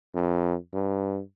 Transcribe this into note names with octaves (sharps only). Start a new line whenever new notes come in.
F2
G2